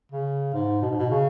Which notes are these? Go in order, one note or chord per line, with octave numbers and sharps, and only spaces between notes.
C#3
G#2
B2
G#2
B2
C#3